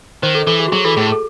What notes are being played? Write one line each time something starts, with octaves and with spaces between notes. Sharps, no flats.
D#3 C5
A4
E3 A4
G#4
F#4
F#3 G#4
E3 A4
A2 G#4
A4